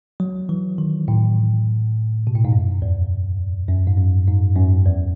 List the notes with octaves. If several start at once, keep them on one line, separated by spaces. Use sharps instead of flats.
F#3
E3
D#3
A2
B2
A2
G#2
F#2
E2
F#2
G#2
F#2
G#2
F#2
E2